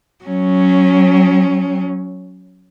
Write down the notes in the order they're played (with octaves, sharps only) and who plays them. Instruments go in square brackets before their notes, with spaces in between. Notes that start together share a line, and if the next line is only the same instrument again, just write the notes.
[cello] F#3 C#4